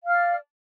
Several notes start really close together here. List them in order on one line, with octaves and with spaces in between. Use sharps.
F5 F6 D5